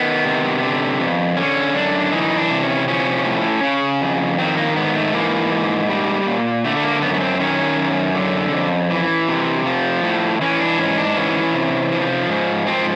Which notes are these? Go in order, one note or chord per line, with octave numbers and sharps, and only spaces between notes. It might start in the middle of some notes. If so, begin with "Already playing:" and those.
Already playing: D#3 B3
C3
D3
F2
D3 C#4
F#2 D4
E3 D#4
D4
C3
C#4
F3 C#4
A2
C#3
F2
D#3 C4
A#3
G#2 B3
A3
E3 A#3
G#2
G3
A#2
D3 A3
A3
A#3
F#2 B3
B3
C4
D#3 C#4
F#2
D3
F2
E3
C3
F3
A2
E3 C#4
D4
G#2 C#4
D4
E3 C#4
C3
F3
G#2
F3 C4